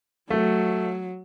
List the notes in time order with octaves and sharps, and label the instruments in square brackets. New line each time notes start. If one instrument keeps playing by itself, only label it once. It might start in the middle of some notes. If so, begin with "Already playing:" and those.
[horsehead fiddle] F#3 [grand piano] A3